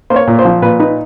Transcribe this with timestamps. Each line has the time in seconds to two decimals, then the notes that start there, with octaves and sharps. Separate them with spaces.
0.10 A#3 C5
0.16 C#5
0.27 A#2
0.39 C5
0.45 F3
0.62 A#2 B4
0.80 D#4 B4